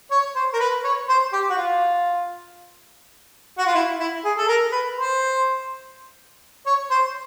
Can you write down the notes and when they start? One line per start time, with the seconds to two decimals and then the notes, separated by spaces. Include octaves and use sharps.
0.12 C#5
0.36 C5
0.54 A#4
0.60 B4
0.85 C#5
1.09 C5
1.33 G4
1.50 F#4
1.57 F4
3.58 F#4
3.66 F4
3.75 E4
4.00 E4
4.24 G#4
4.37 A4
4.48 A#4
4.72 B4
4.97 C5
6.66 C#5
6.91 C5